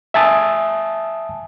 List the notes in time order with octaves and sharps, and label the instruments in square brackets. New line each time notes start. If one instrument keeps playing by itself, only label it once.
[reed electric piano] E5 G#5 A5 D#6